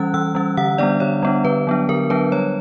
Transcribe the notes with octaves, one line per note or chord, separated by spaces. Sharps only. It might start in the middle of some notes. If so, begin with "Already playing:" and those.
Already playing: E3 G3 C#4 F#6
E3 E6
G3 C#4
D3 F#5
G3 B3 D4 D5
D3 C#5
G3 B3 D4
D3 B4
F#3 B3 D4
D3 A#4
F#3 B3 D4 B4
G3 C#5